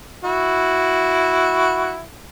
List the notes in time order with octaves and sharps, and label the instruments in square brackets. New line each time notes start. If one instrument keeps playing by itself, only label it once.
[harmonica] E4 F#4